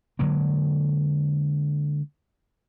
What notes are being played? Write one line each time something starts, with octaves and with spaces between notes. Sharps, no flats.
D3 F#3 G#3 A#3